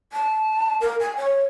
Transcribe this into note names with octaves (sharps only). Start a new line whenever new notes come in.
A5
A#4
G#5
C#5